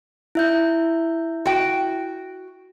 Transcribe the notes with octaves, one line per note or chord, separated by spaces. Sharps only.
E4 E5 G6
F#4 G5